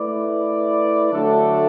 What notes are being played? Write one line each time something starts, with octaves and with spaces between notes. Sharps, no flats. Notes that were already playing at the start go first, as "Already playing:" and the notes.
Already playing: A3 E4 B4 D5
D3 F#3 A3 D4 A4